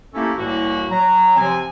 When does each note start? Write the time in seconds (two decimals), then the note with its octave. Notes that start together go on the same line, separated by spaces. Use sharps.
0.14 A3 A#3 C#4 E4 G4 A4
0.37 C2 A2 E3 A#3 F#4
0.90 F#3 A#5
1.36 C3 F3 C4 G#5